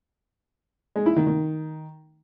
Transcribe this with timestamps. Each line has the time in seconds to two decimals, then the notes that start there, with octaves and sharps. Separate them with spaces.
0.96 G#3
1.06 E4
1.16 D#3
1.27 D#3